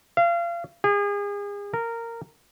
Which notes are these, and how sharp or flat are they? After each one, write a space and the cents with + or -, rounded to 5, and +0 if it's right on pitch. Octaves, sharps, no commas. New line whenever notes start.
F5 -30
G#4 -35
A#4 -15